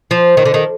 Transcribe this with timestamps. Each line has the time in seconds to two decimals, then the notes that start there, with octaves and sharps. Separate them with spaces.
0.11 F3
0.37 D#3
0.45 D3
0.54 D#3